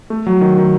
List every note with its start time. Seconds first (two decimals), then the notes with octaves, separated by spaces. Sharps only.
0.10 A3
0.27 F#3
0.41 D#3
0.57 D#3